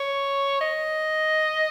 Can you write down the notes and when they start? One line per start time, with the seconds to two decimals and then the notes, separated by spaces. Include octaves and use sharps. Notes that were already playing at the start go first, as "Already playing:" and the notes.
Already playing: C#5
0.61 D#5